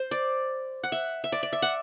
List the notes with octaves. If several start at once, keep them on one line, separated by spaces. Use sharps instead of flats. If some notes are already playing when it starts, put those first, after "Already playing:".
Already playing: C5
D5
F#5
E5
E5
D5
D5
E5
F#5